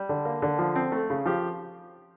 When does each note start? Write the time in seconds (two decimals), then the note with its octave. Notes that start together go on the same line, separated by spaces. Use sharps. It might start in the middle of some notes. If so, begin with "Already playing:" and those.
Already playing: G3
0.09 D3
0.25 A#3
0.42 D3
0.59 F3
0.76 C4
0.92 A3
1.10 C#3
1.26 F3 G4